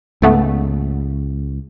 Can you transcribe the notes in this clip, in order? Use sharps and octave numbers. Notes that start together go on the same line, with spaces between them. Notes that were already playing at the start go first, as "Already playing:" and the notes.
C#2 G#2 A3 B3